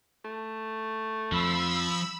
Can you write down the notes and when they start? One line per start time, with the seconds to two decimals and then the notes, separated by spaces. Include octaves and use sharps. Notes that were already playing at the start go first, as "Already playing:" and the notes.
0.25 A3
1.32 F2 F3 B5 E6